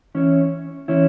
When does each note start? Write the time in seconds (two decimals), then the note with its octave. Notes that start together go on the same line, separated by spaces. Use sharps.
0.15 E3 C#4 E4 C#5
0.88 E3 C#4 E4 C#5